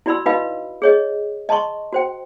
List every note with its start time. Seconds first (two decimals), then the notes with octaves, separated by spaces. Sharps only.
0.06 E4 F#4 D5 B5 C6 E6
0.26 D#4 F#4 B4 D#5 F5 B5
0.82 G#4 C#5 D#5
1.49 D#5 A5 A#5 C6 C#6
1.93 F#4 C5 G5